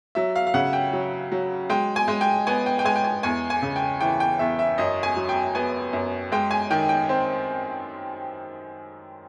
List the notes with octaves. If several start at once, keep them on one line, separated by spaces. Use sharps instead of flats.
F#3 E5
F5
F5
C#3 F#5
G5
F#3
F#3
G#3 G5
G#5
G#3
G5
B3 G#5
G5
G5
G#3 G#5
G5
G#5
E2 G#5
G#5
C#3
G5
E3 G5
G5
E2 E5
E5
F#2 D#5
G#5
F#3
G5
B3 G#5
F#2
G#3 G5
G#5
D#3 G5
G5
C4